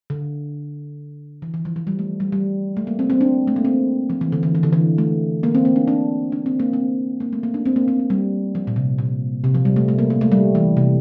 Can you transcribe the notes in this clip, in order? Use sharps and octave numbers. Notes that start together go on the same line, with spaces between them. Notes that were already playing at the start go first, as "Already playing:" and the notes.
D3
E3
E3
F3
F3
G3
A3
G3
G3
A3
A#3
C4
C4
D4
A3
A#3
C4
F3
E3
D3
E3
E3
D3
E3
A3
A#3
C4
A#3
D4
D4
D4
C4
A#3
C4
A#3
A3
A#3
D4
C4
A#3
C4
C4
G3
F3
A#2
C3
A#2
C3
F3
G3
A3
A3
A#3
A#3
A3
G3
E3
C3